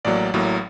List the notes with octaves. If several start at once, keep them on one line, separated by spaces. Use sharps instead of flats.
A1 A2 F#3 A#3 D5
A1 A2 F#3 A#3